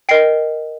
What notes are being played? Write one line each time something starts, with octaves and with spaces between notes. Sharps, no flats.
A#4 D#5 G5 C7